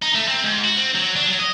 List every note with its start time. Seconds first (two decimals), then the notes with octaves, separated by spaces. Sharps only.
0.02 D#4
0.15 A3
0.28 C4
0.44 G#2
0.64 F#4
0.77 C4
0.94 F#3
1.15 D4
1.27 F#3
1.40 D#5